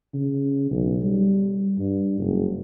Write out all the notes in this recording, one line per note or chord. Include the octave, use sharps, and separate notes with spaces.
C#3
B1
G3
G2
F#1